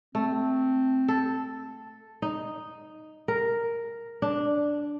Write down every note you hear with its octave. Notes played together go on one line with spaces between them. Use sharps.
A3 C4
A4
D#4
A#4
D4